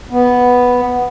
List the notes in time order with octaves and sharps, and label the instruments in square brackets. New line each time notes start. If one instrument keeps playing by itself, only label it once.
[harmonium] B3